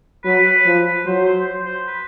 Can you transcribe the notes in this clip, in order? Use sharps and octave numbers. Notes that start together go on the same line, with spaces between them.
F#3 B4
F3
F#3 C5
C5
C5
C5
B4